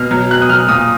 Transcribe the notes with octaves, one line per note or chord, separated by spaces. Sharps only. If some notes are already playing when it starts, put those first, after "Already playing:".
Already playing: B2 F6
F#3
B2 F#6
D#6
F#3 F6
A#2 D#6